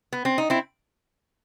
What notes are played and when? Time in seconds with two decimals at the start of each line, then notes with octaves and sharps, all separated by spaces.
0.13 B3
0.25 C4
0.38 D#4
0.50 C4 E4